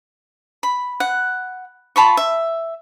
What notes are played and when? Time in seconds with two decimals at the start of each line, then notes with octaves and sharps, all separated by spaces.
0.63 B5
1.00 F#5
1.96 F4 A5 B5 C#6
2.17 E5